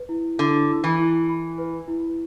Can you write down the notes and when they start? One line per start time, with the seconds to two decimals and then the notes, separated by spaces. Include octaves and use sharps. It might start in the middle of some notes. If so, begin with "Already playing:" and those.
Already playing: B4
0.09 E4
0.38 D3 E4
0.69 E4
0.84 E3
0.99 E4
1.29 B5
1.58 B4
1.88 E4